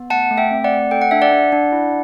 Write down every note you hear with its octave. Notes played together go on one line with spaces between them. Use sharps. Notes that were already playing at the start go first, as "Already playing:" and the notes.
Already playing: B3
A3 F#5 A5
A3
E5 G5
C4
D5 F#5
A3
A4 G5
F#5
D4 E5
D5 F#5
D4
D4
E4